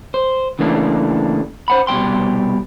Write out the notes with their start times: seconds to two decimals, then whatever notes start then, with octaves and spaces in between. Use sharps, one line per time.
0.14 C5
0.59 C#3 E3 A3 A#3 C4 D4
1.68 C5 F#5 B5
1.87 C2 B2 G3 G5 C6